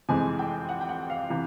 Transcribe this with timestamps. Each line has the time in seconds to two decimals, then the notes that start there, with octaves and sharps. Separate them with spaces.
0.09 F2 C3 E3 G#3 C4 G#5
0.39 G5
0.69 F#5
0.81 G5
0.89 F#5
1.10 F5
1.30 C3 E3